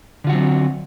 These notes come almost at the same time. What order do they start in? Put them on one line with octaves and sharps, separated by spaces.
D3 F4 F#4 F#3 C4